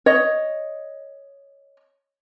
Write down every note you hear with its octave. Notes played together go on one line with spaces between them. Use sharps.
C#5 D#5